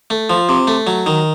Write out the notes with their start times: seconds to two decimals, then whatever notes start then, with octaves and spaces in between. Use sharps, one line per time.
0.10 A3
0.30 F3
0.49 C3
0.67 A3
0.87 F#3
1.06 D#3